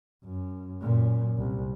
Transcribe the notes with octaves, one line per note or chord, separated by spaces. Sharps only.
F#2
F#2 A#2
C2